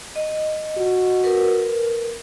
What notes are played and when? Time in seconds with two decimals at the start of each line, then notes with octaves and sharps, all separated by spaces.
0.16 D#5
0.78 F#4
1.24 A#4 B4